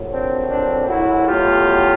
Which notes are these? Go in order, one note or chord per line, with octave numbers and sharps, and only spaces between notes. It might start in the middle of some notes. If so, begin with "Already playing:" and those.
Already playing: A#1 A2 F#3
C4 D4
C4 D4
E4 F#4
E2 B2 F#3 A3 F4 G4